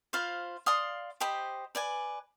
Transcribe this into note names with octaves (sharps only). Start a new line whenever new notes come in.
F4 C5 F5 B5
D5 F5 C6 D#6
G4 C5 D#5 B5
B4 D5 G#5